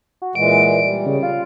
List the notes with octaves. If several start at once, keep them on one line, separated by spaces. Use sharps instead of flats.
F#4
A#2 E3 G#3 D7
G3
C#3
F4